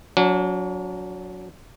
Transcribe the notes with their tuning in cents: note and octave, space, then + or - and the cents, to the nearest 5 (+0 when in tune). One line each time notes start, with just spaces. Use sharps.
F#3 -15 D4 -45